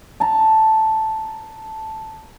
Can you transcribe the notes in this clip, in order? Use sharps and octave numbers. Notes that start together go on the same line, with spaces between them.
A5 A#5